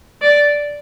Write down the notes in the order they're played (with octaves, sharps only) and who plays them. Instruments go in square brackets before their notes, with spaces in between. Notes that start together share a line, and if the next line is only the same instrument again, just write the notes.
[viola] D5